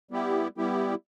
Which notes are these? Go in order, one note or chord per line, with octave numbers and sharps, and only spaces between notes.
G3 B3 E4 G4
G3 B3 E4 G4